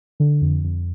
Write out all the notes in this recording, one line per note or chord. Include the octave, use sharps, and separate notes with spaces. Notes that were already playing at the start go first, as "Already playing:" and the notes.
D3
F2
F2